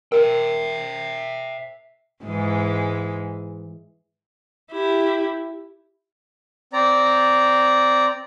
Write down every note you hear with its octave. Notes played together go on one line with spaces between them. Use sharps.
A#4 E5 G5
G#2 E3 G#3
E4 G4
C4 D5 A#5